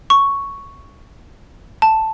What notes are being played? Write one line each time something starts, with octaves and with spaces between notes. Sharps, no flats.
C#6
A5